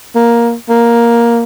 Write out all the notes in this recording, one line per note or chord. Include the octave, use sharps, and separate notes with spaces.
A#3
A#3